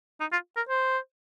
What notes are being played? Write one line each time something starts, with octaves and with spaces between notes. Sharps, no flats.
D#4
F4
A#4
C5